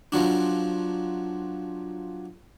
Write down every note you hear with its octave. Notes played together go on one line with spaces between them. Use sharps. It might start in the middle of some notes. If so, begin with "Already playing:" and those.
F3 F#3 D4